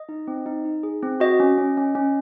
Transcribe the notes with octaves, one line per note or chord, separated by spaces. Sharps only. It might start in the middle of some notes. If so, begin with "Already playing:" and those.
Already playing: D#5
D#4
C4
D#4
D#4
G#4
C4
F#4 D#5
C#4
C#4
C#4
C#4